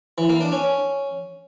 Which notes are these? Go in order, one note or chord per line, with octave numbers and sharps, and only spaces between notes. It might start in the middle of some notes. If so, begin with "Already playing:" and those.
E3
A#3
D4
C#4